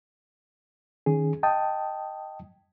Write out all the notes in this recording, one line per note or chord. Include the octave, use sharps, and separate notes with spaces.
D#3 C#4 G#4
D#5 G5 A5 D#6